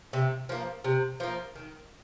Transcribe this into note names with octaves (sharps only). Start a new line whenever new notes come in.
C3
F3 A#3
C3
F3 A#3
D#3